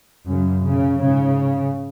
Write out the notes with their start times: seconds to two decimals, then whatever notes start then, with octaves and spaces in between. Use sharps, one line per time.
0.28 F#2 C#3
0.64 C#3
1.00 G#2 C#3